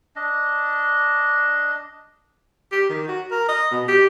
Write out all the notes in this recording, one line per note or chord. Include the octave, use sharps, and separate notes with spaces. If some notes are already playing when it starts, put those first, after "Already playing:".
D4 D#5
G4
D#3
F#4
A#4
D#5
B2
G4